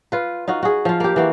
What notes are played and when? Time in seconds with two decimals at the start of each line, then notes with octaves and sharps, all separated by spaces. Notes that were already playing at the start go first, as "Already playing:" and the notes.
0.12 F4 B4
0.48 D#4 F4 F#4
0.63 F#4 G#4
0.85 F3 F4
1.00 A#3 G4
1.16 E3 A#3 F#4